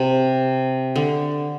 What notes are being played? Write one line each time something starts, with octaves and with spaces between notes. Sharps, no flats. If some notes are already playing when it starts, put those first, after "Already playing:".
Already playing: C3
D3